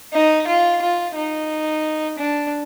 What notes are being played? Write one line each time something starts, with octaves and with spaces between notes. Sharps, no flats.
D#4
F4
F4
D#4
D4